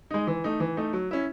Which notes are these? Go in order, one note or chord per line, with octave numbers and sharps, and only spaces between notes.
G#3 D#4
E3
A3 D#4
E3
A3 D#4
F#3
C#4 E4